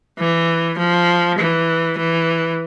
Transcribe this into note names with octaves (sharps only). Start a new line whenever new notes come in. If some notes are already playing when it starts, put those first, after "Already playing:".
E3
F3
E3
E3